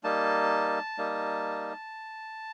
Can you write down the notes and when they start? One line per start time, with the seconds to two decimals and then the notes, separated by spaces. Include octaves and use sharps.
0.04 G3 A#3 D#4 A5
0.98 G3 A#3 D#4